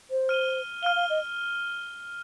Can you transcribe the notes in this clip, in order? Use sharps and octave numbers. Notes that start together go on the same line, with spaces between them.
C5
F6 D#7 G7
F5 F6 D#7 G7
F5
D#5